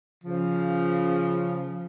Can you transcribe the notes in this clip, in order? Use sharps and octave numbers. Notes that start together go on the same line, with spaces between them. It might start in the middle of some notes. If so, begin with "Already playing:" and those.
C#3 F3